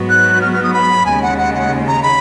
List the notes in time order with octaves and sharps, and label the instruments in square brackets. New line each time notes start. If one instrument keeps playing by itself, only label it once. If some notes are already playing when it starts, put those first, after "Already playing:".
Already playing: [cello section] G#2 F#3 B3 F#4
[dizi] F#6
F6
F6
D#6
B5
[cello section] D#2 C#3 G#3 [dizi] G#5
[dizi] F#5
F#5
F#5
A#5
B5